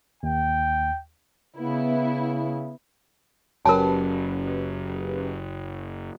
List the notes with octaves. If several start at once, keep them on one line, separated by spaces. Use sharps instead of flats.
D#2 G5
C#3 B3 E4
F#1 F#3 C#4 G4 A#4 B4 A5